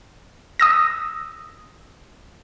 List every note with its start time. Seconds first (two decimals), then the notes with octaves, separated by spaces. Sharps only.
0.60 D#6 E6 A#6